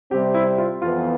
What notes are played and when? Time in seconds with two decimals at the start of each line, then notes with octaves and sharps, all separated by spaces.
0.11 C3 G3 C4 G4
0.34 E4
0.58 F4
0.82 F2 E3 B3 F4